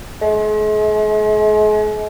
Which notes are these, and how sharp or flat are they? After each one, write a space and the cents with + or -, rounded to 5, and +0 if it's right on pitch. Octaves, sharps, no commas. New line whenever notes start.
G#3 +40